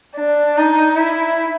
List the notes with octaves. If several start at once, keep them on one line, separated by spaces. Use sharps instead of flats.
D4
D#4
E4